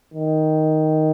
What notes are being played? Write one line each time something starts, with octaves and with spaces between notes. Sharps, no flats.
D#3